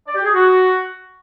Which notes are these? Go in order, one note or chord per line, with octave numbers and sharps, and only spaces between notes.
D5
G4
G#4
F#4